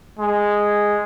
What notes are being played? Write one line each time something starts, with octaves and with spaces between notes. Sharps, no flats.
G#3